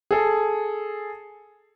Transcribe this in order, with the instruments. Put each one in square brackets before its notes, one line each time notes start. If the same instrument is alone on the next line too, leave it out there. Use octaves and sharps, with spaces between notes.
[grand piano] G#4 A4